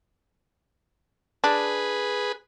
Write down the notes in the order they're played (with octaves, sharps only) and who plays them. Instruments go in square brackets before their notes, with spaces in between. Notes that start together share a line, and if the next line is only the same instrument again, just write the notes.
[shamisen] D4 [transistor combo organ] G#4 B4